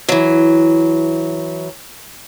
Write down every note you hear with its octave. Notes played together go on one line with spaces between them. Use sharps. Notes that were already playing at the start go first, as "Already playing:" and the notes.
E3 F#3